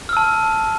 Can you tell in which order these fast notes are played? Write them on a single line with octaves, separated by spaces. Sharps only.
F6 E6 A5